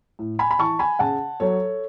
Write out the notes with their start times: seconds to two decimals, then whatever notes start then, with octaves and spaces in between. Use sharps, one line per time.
0.19 A2
0.39 G#5 B5
0.51 B5
0.59 E3 A5 C#6
0.79 G#5 B5
0.99 C#3 F#5 A5
1.40 F#3 A4 C#5